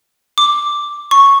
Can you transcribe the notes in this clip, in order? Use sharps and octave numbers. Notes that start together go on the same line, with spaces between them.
D6
C#6